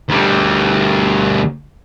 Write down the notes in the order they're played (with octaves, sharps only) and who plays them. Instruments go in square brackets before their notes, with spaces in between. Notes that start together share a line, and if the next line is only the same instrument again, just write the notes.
[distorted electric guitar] D2 G3